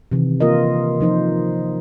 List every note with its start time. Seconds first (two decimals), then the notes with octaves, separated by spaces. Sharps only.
0.12 C3 D#3 E3
0.40 A#3 F4 A#4 D#5
1.00 F3 D#4 C5